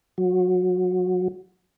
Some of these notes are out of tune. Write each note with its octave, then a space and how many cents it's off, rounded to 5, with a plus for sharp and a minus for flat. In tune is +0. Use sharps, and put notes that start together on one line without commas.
F#3 -25